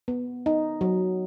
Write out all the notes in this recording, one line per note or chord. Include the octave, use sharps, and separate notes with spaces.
B3
D#4
F#3